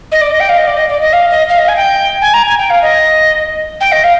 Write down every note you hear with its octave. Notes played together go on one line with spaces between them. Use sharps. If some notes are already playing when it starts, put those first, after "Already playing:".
D#5
D5
D#5
G5
F5
D#5
D5
D#5
D5
D#5
F5
D#5
F5
D#5
G#5
G5
G#5
A#5
G#5
G5
F5
D#5
G5
D#5
F5